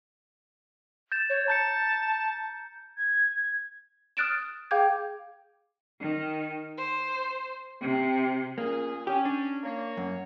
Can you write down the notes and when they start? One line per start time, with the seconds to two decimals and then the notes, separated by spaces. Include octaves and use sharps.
1.12 G6 A6 E7
1.30 C#5
1.48 A5 A#5 G6 C#7
2.97 G#6
4.17 D#6 F6 F#6 A6 D7 E7
4.71 G#4 F5 G5 D6 G6 G#6
6.00 D#3
6.77 C5
7.81 C3
8.58 A#2 A#3 C#4 G#4
9.07 C#4 G4
9.25 D4
9.63 A#3 C#5
9.97 F#2